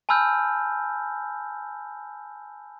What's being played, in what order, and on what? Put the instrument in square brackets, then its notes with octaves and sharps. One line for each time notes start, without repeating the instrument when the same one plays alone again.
[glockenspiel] G#5 A5 B5 E6 F6 G6